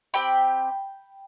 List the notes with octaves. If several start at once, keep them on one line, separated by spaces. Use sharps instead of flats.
C4 G4 G5 B5